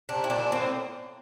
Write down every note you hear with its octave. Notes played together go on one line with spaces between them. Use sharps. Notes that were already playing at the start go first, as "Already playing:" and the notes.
C3 D4
E4
A#2 D4
A2 C4